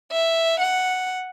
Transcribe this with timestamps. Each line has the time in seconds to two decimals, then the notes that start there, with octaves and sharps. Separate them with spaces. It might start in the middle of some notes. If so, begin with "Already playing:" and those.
0.12 E5
0.60 F#5